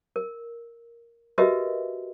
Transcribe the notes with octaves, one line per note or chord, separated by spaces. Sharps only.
A#4
F#4 G4 A#4 B4 D#5 E5